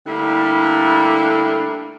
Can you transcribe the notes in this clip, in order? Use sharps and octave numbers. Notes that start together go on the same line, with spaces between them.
D3 G3 A3 A#3 D4 E4